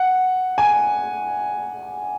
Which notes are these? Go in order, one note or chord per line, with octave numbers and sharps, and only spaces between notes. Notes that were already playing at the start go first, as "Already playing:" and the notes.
Already playing: F#5
G#5